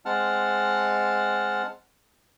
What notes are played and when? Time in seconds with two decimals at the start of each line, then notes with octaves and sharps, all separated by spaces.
0.05 G#3 C4 F#5 A5 F6